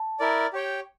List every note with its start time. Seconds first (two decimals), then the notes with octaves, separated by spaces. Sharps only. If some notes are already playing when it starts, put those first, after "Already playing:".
Already playing: A5
0.20 E4 A#4 D5
0.53 G4 C#5 G5